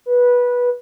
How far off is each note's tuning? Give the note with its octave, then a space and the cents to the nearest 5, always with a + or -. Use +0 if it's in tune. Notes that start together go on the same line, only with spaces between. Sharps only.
B4 -15